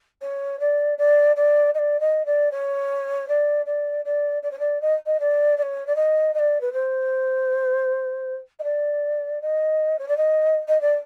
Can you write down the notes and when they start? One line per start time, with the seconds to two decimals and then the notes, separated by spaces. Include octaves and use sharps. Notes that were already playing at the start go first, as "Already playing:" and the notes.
0.21 C#5
0.59 D5
0.98 D5
1.36 D5
1.74 D#5
1.78 D5
2.00 D#5
2.25 D5
2.51 C#5
3.28 D5
3.66 D5
4.05 D5
4.42 D5
4.51 C#5
4.59 D5
4.81 D#5
5.06 D#5
5.20 D5
5.57 D5
5.62 C#5
5.87 D5
5.95 D#5
6.34 D#5
6.39 D5
6.61 B4
6.73 C5
8.59 D#5
8.63 D5
9.41 D#5
9.99 C#5
10.08 D5
10.17 D#5
10.68 D#5
10.81 D5